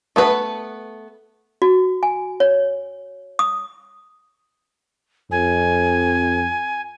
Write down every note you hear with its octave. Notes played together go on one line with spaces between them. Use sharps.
A3 B3 B4
F#4
G#5
C#5
D#6
F2 G#5